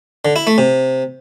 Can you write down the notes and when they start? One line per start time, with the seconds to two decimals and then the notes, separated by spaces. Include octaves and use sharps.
0.25 D3
0.36 E4
0.47 A3
0.58 C3